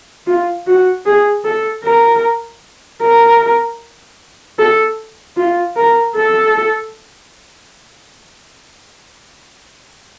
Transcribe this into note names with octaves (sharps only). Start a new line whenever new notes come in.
F4
F#4
G#4
A4
A#4
A#4
A4
F4
A#4
A4